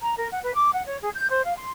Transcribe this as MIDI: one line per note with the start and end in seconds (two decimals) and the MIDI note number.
0.01 0.14 82
0.17 0.28 70
0.31 0.39 78
0.43 0.53 71
0.55 0.69 86
0.73 0.84 78
0.87 0.97 73
1.02 1.09 68
1.14 1.28 91
1.30 1.41 72
1.44 1.55 77
1.58 1.70 84